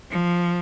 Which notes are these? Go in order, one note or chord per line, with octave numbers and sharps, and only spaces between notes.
F3